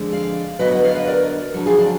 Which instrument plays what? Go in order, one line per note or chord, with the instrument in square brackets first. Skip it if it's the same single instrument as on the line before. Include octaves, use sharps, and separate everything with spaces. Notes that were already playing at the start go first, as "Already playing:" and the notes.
Already playing: [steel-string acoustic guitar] F2 D3 G#3
D5 F5
D2 D3 F#3 B3 B4 D#5
D#5 F#5
D5 F5
B4 D#5
A#4 D5
F2 D3 F#3
F4 G#4
D4